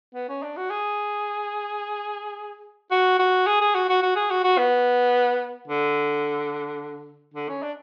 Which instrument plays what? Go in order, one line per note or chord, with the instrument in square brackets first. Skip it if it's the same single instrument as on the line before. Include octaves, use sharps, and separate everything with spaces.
[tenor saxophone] B3
C#4
D4
F#4
G#4
F#4
F#4
G#4
G#4
F#4
F#4
F#4
G#4
F#4
F#4
B3
D3
D3
C#4
D4